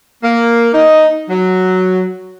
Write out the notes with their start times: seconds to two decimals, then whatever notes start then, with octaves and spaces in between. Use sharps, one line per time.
0.23 A#3
0.74 D#4
1.30 F#3